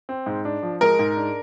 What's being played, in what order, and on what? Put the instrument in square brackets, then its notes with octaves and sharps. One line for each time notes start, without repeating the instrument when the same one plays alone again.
[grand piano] C4
G#2
D4
F3
[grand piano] G#3 [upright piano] A#4
[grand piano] G#2
D4